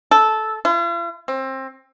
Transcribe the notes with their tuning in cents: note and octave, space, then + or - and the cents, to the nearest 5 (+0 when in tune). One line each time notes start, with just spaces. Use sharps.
A4 -10
F4 -45
C4 +25